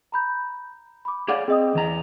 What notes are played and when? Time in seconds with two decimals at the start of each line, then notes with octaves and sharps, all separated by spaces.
0.12 A#5 B5 G6
1.05 B5 D6
1.28 G#4 C#5 D5 F5 F#5 D6
1.48 C4 G#4 D#5 D#6
1.75 E2 A#5